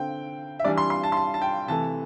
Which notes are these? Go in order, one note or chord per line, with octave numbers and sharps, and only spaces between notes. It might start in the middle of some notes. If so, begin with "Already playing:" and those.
Already playing: D3 C4 G5
E5
E3 G3 D4 D5
C6
C6
A5
C6
A5
A5
G5
C3 E3 A3 A5